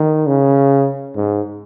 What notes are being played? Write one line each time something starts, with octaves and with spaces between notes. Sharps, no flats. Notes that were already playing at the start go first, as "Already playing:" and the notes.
Already playing: D#3
C#3
G#2